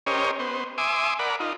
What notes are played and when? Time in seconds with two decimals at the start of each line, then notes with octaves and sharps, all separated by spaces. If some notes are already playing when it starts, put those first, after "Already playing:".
0.07 C#4 G4 A#4 C5 C#5 D#5
0.39 B3 C5
0.78 E5 G#5 C6 D6 D#6
1.19 A#4 D5 F#5 B5
1.40 D#4 F4